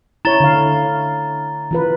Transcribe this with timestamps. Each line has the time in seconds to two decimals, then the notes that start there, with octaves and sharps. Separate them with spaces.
0.25 E4 C#5 A#5 A6 G7
0.40 D3 F5
1.71 E3 F4 B4